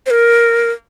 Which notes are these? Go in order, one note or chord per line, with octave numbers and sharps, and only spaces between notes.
C5
A#4